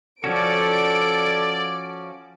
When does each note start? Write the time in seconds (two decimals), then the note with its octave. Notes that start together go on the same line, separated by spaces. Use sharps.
0.24 F3 C#4 F#4 A4 D5 D7